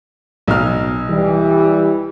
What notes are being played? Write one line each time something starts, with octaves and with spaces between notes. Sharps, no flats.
B1 F6
E3 G3